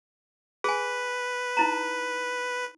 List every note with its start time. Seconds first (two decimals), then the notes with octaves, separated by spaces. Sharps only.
0.64 G#4 B4 G#5
1.57 D#4 E4 A#5